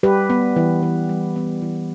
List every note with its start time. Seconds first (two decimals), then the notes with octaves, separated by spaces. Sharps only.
0.03 G3 G4 B4
0.30 B3
0.56 E3
0.82 E3
1.09 G3
1.36 B3
1.62 E3